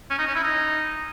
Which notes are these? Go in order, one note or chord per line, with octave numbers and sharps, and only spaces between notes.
C#4
D#4
C#4
E4
D#4